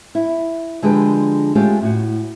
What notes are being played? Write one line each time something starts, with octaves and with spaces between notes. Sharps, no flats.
E4
D3 F3 G#3 D4 G4 B4
G#3 A3 C#4 F4 G4
A2 F#4